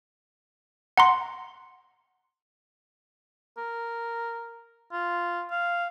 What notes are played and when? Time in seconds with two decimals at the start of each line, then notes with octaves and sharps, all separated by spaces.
0.97 F#5 A#5 C6
3.57 A#4
4.92 F4
5.51 F5